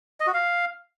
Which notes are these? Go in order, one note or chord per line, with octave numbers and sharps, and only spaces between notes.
D#5
F#4
F5